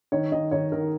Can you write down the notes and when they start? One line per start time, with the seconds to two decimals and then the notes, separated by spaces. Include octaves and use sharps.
0.12 D#3 C#5
0.32 D#3 D#5
0.51 D#3 C#5
0.72 D#3 A#4